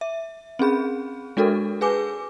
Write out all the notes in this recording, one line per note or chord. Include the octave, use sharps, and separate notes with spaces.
E5
C4 C#4 G#4 B5
G#3 D4 F#4 A4 A#4
G#4 B4 G#5 D6